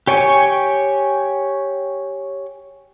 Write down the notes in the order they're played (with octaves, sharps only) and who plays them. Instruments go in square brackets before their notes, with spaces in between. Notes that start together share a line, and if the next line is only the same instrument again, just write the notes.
[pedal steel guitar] G4 C#5 G5 G#5 C#6